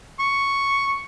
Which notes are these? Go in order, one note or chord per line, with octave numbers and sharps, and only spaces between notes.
C#6